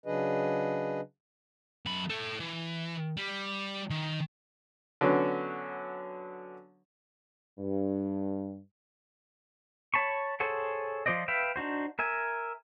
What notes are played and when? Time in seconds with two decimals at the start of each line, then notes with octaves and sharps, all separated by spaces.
0.06 C#3 F#3 D4 G#4 B4 D#5
1.86 F#2 B5
2.10 A4 C#5
2.40 E3
3.17 G3
3.90 D#3
5.01 D3 F#3 B3 C#4
7.59 G2
9.94 C#5 A5 B5 C#6
10.40 G#4 A4 C5 C#5 F#5
11.06 F3 F4 C5 D5 D#5
11.28 B4 E5 F5 G5
11.56 D4 D#4 F#4 C5
11.99 A#4 E5 G#5